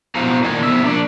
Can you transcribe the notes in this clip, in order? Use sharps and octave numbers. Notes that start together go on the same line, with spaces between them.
B2 F#4 C5 F5 A#5
D#3 A#3 D5 D#5 G#5
C3 B3 E5
A#3 D4 D5